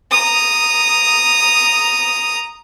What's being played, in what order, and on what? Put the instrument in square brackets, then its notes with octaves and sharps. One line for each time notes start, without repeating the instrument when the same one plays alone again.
[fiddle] A#5 D#6